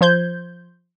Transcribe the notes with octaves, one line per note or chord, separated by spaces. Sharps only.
F3 C5 G6 G#6